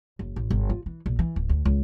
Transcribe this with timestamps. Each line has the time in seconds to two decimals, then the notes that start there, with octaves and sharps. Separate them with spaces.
0.19 F#1
0.36 A1
0.50 G1
0.70 F4
0.86 E3
1.06 A#1
1.19 E3
1.36 D1
1.49 D2
1.65 C#2